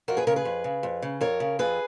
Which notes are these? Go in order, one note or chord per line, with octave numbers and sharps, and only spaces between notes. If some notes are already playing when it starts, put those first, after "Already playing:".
F2 F#4 A#4
G#4 B4
C#3 A#4 C#5
G#4 B4
F2
C#3
F2
C#3
F2 A#4 C#5
C#3
F2 G#4 B4